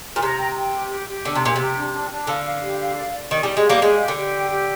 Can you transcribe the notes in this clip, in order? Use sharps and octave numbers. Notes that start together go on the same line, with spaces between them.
A#2
C3 A#5
G5
G5
G4
G4
G4
D3 D4
C3
A#2 G4
C3 G4
D4
D4
D4
D3 F5
F5
G4
F5
D5
D5
D#3 G4
G3
G4
G#3
G3 A#3 F5
G#3 G4
G4
D3
G4
G5
G4